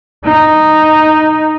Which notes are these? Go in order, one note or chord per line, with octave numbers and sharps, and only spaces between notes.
D#4